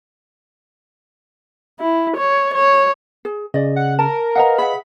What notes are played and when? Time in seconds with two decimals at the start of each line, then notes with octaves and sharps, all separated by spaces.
1.80 E4
2.17 C#5
2.54 C#5
3.25 G#4
3.54 C#3 D5 D#5
3.76 F#5
3.99 A#4 A5
4.36 B4 D#5 F5 F#5 A#5
4.58 G#4 E5 F#5 B5